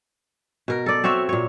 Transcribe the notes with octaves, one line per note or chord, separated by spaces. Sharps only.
B2 A#4
A4 D5
C4 F#4 C#5 E5
A#2 C#5